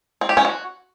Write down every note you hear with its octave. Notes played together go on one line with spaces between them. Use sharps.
C4
G4
C#4
F#4